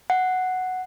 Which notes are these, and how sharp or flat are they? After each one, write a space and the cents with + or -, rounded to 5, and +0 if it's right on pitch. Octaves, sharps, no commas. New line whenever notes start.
F#5 +0